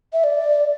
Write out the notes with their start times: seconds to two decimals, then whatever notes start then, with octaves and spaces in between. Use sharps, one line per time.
0.13 E5
0.24 D5